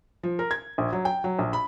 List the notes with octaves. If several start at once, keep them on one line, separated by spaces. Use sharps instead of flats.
F3
A#4
G#6
A#1
F#3
G5
F#3
A#1
B5